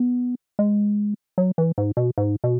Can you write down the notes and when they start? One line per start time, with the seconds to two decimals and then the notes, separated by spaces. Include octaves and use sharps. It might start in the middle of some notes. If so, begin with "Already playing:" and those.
Already playing: B3
0.59 G#3
1.38 F#3
1.58 E3
1.78 G#2
1.97 B2
2.18 G#2
2.44 B2